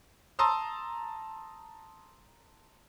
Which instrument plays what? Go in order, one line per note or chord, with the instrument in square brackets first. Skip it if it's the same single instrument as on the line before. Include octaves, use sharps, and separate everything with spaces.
[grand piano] A5 A#5 C6 D#6 E6